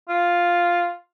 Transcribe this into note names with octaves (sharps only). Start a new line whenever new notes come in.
F4